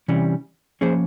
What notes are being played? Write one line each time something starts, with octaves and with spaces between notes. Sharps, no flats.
C3 E3 G3 C#4
F3 A#3 C#4 G#4 C5